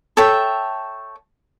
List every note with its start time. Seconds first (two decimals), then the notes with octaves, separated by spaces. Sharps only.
0.17 A4 C#5 E5 G5